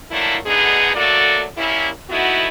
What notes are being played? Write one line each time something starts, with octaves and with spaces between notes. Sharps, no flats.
F3 F#3 A3 A#3 D4 E4
D2 B2 D3 B3 D#4 G#4
F#3 A3 A#3 F#4 A4 D5
G3 A#3 C#4 E4
A3 B3 D#4 E4 F#4